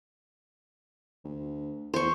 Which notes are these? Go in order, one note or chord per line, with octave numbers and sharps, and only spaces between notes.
D2
E2 C5 C#6